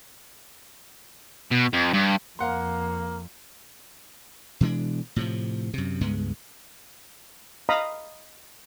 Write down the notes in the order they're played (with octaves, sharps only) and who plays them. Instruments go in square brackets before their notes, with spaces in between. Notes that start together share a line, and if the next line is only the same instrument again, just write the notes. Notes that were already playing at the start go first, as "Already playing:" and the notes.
[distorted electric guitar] B2
F2
G2
[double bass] F2 [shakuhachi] A#3 [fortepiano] F5 F#5 C6
[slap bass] B2 E3 G#3 D4
A2 C3 F3
F#2 C3
C#2 G2 G#3 B3
[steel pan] D#5 F5 A#5 B5 D#6